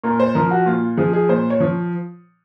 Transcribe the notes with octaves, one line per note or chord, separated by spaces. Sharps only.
A#2 A#4
C5
F3 A#4
F#4
A#2 F4
F3 G#4
G#4
A#2 C5
C#5
F3